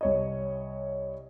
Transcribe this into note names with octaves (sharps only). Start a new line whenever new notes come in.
C2 C#5 D#5